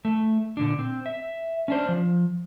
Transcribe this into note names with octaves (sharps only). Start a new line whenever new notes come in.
A3
A#2 D3 D4
C4
E5
C#4 D4 C5
F3